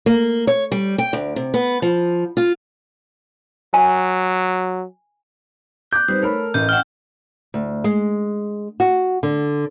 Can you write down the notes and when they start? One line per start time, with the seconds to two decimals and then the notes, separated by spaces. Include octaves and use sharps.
0.06 A#3
0.47 C#5
0.72 G3
0.98 G5
1.13 D2
1.36 C3
1.54 B3
1.82 F3
2.37 F4
3.74 F#3 G#5
5.93 D6 F#6 G6
6.08 G3 C4 D#4 B4 C5
6.23 A3 A4 A#4 C#5 B5
6.54 A1 D#5 G6
6.69 C#4 F#5 G5 F6
7.54 D2
7.84 G#3
8.80 F#4
9.23 D3